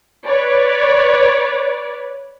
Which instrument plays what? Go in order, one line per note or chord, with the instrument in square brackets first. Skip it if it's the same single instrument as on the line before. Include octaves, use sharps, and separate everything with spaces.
[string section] B4 C#5 D5